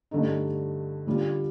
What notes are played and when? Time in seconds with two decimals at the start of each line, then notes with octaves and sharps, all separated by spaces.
0.11 G2 D3 A3 D#4
1.07 D3 G3 D4 F4